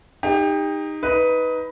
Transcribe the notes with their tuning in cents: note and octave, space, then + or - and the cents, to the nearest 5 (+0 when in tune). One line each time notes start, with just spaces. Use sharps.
D#4 -5 G4 +30
D#4 +20 B4 +0